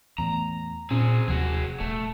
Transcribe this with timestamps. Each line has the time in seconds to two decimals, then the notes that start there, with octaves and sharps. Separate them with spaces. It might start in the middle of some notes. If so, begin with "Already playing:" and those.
0.18 E2 A2 A#5
0.91 A#2 C4 C#4 G#4
1.28 E1 D#2 C3 F3 F#4 G#4
1.80 D#1 A3